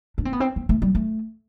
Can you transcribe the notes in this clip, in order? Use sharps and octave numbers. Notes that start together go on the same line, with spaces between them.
D4
C4
B3
C4
B3
A3
G3
A3